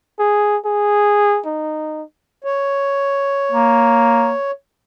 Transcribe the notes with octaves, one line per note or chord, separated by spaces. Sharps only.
G#4
G#4
D#4
C#5
A#3